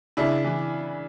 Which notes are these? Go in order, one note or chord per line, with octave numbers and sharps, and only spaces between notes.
C#3 D4 E4
E3